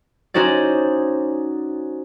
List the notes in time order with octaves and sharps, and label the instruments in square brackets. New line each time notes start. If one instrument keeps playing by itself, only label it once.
[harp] C#4 D#4 F#4 C5 D5